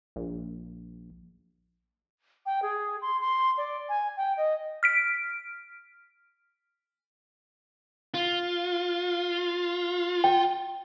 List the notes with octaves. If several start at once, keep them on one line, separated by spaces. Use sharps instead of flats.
A#1
G5
G#4
C6
C6
D5
G#5
G5
D#5
F6 B6 D7
F4
G5